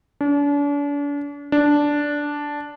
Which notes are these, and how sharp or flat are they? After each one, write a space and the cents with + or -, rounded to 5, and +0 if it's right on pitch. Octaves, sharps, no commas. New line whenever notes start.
D4 -40
D4 -5